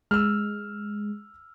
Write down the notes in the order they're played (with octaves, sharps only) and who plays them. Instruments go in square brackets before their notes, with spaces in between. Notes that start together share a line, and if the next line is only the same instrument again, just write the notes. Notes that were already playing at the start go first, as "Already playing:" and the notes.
[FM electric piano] G#3 [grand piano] E6 F6